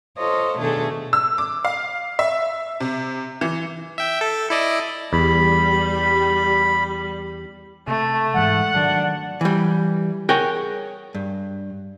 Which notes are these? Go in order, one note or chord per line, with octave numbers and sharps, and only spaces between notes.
F4 A4 C5 C#5 D#5
B2 D#3 A3 D4 G#4 A4
E6
D6
F5
E5
C3
E3
E5 G5
A4
E4 D5 D#5
E2 G3 B5
C3 A3
G#2 E3 G#3 F#5
D#3 F#3 D4
E3 G3
G#4 A#4 C#5 F#5 G5
G2